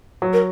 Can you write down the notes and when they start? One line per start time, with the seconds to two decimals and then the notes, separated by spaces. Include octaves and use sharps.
0.22 F#3
0.33 A#4